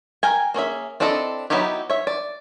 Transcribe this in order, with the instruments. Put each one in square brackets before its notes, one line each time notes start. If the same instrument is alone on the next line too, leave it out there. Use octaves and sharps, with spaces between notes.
[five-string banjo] A#4 G5 G#5
A#3 C#4 G#4 E5
C4 D4 E4 A4 D#5
F#3 B3 D#4 E4 G4
C#5 E5
D5